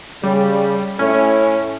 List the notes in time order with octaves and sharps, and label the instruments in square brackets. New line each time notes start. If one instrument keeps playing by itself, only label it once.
[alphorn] C#3 [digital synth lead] G3
[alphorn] A2 [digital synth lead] C#4